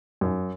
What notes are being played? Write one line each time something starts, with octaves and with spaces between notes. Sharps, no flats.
F#2